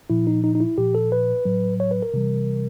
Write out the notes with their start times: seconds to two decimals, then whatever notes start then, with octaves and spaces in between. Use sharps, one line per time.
0.10 A#2 F3 E4
0.27 D#4
0.44 D#4
0.55 D#4
0.60 E4
0.78 A#2 F3 G4
0.95 A4
1.12 B4
1.45 A2 F#3
1.80 C#5
1.91 B4
2.02 A#4
2.14 C3 E3 G3